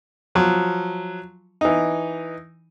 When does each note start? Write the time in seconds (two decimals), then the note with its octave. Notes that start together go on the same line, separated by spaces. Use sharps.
0.35 F3 F#3
1.61 E3 D#4